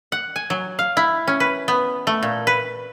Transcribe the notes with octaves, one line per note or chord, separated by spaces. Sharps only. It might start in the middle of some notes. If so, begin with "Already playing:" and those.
F#5
G#5
F#3
F5
E4
C#4
B4
B3
A3
A#2
B4